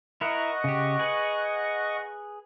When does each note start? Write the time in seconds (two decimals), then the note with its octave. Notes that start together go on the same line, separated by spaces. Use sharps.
0.21 E4 A#4 D#5 F#5 C#6
0.64 C#3 G4
0.99 G#4 B4